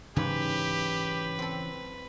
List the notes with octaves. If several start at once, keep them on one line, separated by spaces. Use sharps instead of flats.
G#2 C#3 E3 F#3 G4 B4
C4 A4